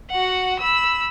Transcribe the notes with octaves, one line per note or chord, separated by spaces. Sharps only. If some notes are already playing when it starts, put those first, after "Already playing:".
F#4 F#5
B5 E6